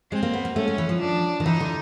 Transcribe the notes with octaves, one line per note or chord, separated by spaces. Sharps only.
G#3 C4
A#3
B3
A#3
A3 C#4
G#3
E3
F3
D4
D#3
E3 D#4
D3